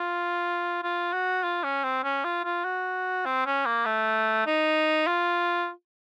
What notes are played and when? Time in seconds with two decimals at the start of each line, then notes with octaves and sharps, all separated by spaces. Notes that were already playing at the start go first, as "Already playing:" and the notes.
Already playing: F4
0.83 F4
1.13 F#4
1.43 F4
1.64 C#4
1.84 C4
2.04 C#4
2.24 F4
2.44 F4
2.65 F#4
3.25 C4
3.46 C#4
3.66 A#3
3.86 A3
4.47 D#4
5.07 F4